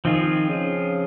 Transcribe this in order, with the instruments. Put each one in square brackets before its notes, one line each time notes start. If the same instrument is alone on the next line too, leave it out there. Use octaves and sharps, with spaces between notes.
[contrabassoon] D#3 [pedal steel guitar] F3 C4 F4 G#4
[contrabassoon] C#3